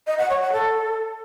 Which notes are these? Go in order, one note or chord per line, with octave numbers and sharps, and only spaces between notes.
D#5
F#5
C#5
F#5
A4